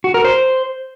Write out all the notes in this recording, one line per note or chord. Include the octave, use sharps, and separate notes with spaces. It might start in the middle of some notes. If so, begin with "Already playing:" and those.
F#4
A#4
C5